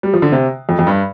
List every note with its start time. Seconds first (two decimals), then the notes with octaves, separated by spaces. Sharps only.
0.03 G3
0.14 F3
0.22 D3
0.32 C3
0.69 F2
0.79 F2
0.87 G2